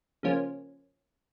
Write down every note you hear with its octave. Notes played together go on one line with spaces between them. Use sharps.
C#3 F3 A#3 C#4